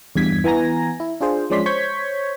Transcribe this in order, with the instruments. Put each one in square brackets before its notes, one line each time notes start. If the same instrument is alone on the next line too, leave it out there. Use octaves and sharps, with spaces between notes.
[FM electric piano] E2 G2 G#6 B6
E3 B3 G#5 A#5 A#6
E4
D4 F4 G#4 C5
F3 G#3 C#4 D5 C6 B6
C5 C#5 C#6 G6 G#6 B6